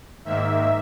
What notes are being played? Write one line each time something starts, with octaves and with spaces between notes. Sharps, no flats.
G#2 D#3 A#3 E5